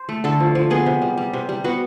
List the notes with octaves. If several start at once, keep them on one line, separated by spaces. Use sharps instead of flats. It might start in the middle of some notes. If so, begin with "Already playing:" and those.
Already playing: C5
A3
D3 A4
F3
F3
B3 G#4
C3
G3
G3
C3
G3
B3 F#4